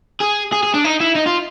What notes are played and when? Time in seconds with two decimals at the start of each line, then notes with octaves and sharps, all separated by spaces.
0.21 G#4
0.52 G#4
0.63 G#4
0.74 D4
0.84 D#4
1.00 E4
1.15 D#4
1.26 F4